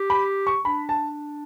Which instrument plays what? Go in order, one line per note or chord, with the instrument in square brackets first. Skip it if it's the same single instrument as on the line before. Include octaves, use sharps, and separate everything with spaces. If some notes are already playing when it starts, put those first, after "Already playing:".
Already playing: [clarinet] G4
[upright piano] B5
C#6
[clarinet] D4 [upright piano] B5
[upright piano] A5